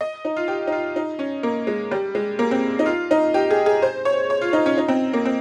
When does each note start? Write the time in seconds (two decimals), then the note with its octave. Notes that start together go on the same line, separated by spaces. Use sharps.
0.01 D#5
0.25 D#4
0.36 F4
0.48 G4
0.67 D#4
0.72 F4
0.96 D#4
1.19 C#4
1.43 A#3
1.67 G#3
1.91 G3
2.15 G#3
2.39 A#3
2.51 C4
2.79 D#4
2.86 F4
3.11 D#4
3.34 G4
3.51 G#4
3.66 G#4
3.82 C5
4.05 C#5
4.30 C#5
4.41 F4
4.53 D#4
4.66 C#4
4.78 D#4
4.88 C4
5.13 A#3
5.25 C4